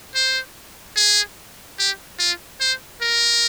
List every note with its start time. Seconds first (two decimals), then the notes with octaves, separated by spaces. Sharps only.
0.15 C5
0.96 G#4
1.79 G4
2.19 F4
2.60 C5
3.01 A#4